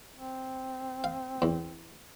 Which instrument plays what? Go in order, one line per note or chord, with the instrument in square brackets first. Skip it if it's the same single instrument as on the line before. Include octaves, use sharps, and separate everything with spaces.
[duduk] C4
[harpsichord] F5
E2